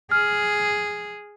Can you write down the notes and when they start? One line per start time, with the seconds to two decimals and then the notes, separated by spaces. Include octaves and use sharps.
0.11 G#4 F6